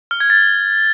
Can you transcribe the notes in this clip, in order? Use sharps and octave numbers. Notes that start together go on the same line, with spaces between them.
F6
G#6
A6